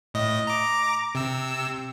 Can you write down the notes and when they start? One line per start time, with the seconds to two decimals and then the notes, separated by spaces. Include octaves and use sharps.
0.14 A2 D#5
0.47 A#5 D6
1.15 C3 E6